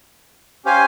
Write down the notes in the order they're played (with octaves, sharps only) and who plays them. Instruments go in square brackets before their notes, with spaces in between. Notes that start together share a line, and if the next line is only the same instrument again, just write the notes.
[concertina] C#4 G4 C5 F5 G#5